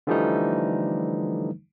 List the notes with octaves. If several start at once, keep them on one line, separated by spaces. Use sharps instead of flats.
D3 E3 F3 G3 A3 D#4